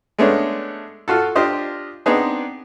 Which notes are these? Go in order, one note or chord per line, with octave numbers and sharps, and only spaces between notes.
G#3 A3 B3 C#4 D4
F4 F#4 A4
D4 F4 G4 C5 D#5
B3 C4 D4 D#4 G#4